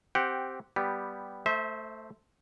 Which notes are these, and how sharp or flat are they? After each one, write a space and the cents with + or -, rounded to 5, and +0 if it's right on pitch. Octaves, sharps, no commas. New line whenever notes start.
C4 +0 G4 -5 F#5 +0
G3 +0 B3 +0 G4 +0
A3 +5 C5 +0 E5 -30